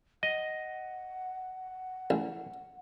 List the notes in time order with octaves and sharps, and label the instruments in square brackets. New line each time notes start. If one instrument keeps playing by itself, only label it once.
[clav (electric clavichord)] D#5 [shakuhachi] F#5
[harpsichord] A1